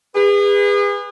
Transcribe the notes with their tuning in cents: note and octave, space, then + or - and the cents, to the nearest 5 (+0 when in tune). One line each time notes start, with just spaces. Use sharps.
G#4 -35 B4 +0